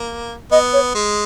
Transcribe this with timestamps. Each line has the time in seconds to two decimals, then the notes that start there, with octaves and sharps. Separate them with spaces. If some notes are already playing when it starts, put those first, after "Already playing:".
Already playing: A#3
0.52 B3 D#5
0.73 C#5
0.95 G#3